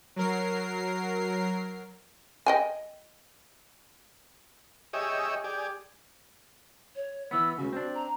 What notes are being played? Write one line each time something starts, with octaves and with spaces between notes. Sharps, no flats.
F#3 A#4 C7
D#5 G5 G#5
G4 G#4 C#5 D#5 E5
G4 G#4 D5
C#5
E3 B3 E6
C#2 C#3 F#4
C4 D4
A#5